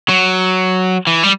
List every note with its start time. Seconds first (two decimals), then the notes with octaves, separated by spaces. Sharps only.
0.09 F#3
1.07 E3
1.23 G3